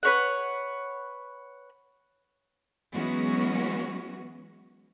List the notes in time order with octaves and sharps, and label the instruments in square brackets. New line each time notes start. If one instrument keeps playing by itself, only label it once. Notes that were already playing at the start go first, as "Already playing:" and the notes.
[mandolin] B4 C#5 F#5
[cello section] E3 F#3 G#3 B3 C#4 F#4